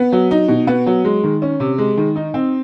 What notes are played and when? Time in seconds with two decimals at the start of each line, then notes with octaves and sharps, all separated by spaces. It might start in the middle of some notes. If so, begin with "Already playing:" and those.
Already playing: B3
0.12 F#3
0.31 D#4
0.48 B2
0.67 B3
0.87 F#3
1.05 G#3
1.24 D#3
1.42 C#4
1.60 C3
1.78 G#3
1.97 D#3
2.16 D#4
2.34 C4